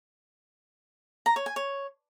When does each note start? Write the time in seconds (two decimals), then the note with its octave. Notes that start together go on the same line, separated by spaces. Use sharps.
1.26 A#5
1.36 C#5
1.46 G#5
1.56 C#5